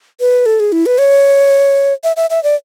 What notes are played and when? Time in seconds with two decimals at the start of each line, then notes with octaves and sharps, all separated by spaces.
0.20 B4
0.46 A4
0.60 G#4
0.72 E4
0.86 B4
0.98 C#5
2.04 E5
2.17 E5
2.30 E5
2.43 D5